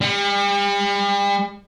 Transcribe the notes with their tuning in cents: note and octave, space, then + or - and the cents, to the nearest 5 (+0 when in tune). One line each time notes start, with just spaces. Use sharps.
G3 +40